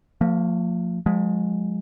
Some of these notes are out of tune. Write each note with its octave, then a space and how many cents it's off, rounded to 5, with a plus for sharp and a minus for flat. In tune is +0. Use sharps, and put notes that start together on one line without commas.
F3 +20 A#3 -45
F3 +40 G#3 +0